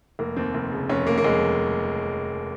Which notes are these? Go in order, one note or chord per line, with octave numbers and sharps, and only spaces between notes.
F1 A#3
D#2 C4
F1
C#3
F1 C#4
D#2 A#3
A#3
F1 G#3